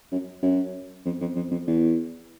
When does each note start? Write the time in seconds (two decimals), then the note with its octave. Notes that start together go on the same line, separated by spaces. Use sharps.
0.12 F#2
0.43 F#2
1.05 F2
1.21 F2
1.36 F2
1.51 F2
1.67 E2